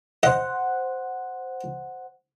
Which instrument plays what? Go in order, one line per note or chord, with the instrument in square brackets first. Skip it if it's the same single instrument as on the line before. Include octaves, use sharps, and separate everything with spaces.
[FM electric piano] C5 F#5 [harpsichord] D#5